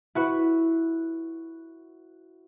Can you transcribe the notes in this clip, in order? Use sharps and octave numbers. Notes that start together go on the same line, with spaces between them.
E4 F#4 B4